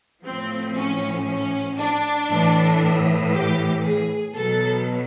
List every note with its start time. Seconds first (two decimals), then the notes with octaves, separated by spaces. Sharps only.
0.24 A2 F3 C4
0.76 C#4
1.27 C#4
1.79 D4
2.30 A2 E3
3.33 G4
3.84 G#4
4.35 B2 F#3 A4